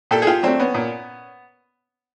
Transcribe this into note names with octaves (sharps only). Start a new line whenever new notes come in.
A#2 G4 A4
G#4
F4 G4
F#3 A3 C4 D4
B3 C#4
A#2